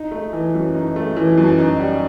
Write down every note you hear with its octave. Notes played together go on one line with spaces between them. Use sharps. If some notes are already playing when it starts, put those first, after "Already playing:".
Already playing: D#4
A3
E3
F#2
D#4
A3
E3
F#2
D#4
G3